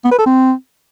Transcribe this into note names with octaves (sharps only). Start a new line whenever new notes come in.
B3
B4
A4
C4